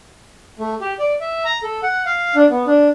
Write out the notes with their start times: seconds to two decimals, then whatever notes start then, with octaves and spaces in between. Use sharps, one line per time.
0.59 A3
0.81 G4
0.99 D5
1.20 E5
1.45 A#5
1.63 A4
1.83 F#5
2.06 F5
2.35 D4
2.50 B3
2.67 D4